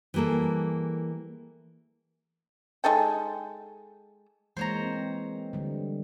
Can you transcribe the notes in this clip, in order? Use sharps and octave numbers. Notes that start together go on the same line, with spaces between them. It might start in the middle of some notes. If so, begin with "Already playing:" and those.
E3 G3 A#3 G#4 A4
G#3 D#4 A4 G5
E3 G#3 A#3 C5 C#5 A#5
C4
D3 G3